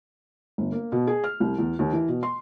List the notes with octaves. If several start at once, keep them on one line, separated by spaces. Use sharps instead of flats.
G1
A#3
B2
G#4
F6
C2
E2
D#2
E3
B2
C6